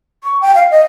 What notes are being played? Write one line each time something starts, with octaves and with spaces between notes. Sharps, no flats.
C#6
G5
F5
D#5